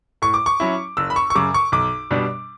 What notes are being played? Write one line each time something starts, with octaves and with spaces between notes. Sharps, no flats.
A2 C#6
D6
C#6
F#3 C#4 E4
F#1 E6
B5
C#6
C#6
F#2 C#3 D6
C#6
B1 D6
B2 G3 D4